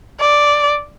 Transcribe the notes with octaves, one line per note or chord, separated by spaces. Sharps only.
D5